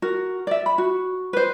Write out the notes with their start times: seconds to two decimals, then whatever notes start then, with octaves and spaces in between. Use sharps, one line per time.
0.02 F#4 A#4
0.47 D5 E5
0.66 B5
0.78 F#4
1.33 B4 C5